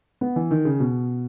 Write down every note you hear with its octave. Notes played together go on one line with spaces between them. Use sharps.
B3
E3
D#3
C#3
B2